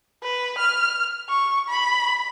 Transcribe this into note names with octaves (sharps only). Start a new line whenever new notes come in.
B4
F6
C#6
B5